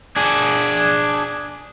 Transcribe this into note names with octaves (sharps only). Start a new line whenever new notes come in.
D4 G#4